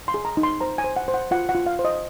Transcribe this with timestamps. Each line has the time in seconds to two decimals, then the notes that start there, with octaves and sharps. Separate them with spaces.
0.08 C6
0.14 G#4
0.25 A#5
0.37 D#4
0.43 C6
0.61 C5 A#5
0.78 G#5
0.84 C5
0.96 F#5
1.08 C5
1.14 F#5
1.31 F4 F#5
1.49 F#5
1.55 F4
1.66 F5
1.79 C5
1.85 D#5